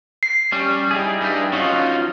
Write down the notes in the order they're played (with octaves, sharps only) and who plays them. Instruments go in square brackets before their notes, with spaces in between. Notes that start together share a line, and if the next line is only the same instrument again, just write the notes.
[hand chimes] C7
[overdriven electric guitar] G3 [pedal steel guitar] C#4
[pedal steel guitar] D#4 E4 G#4
[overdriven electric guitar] G2 G3
[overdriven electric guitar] F#3 F4 [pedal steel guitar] C#4 D#4 F#5